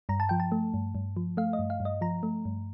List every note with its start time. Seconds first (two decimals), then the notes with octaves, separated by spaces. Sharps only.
0.09 G2 A#5
0.20 A5
0.29 F3 G5
0.40 A5
0.52 A3
0.74 G2
0.95 G2
1.17 F3
1.37 A3 F5
1.53 D#5
1.59 G2
1.70 F5
1.80 G2
1.85 D#5
2.01 F3 A#5
2.23 A3
2.45 G2